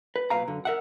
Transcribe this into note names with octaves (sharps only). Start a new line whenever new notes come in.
B4
B1 A#2 B4 F5 A#5
F#2 D3
A#4 E5 F#5